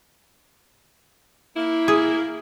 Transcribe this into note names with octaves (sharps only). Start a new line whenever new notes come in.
A#3 E4
G#4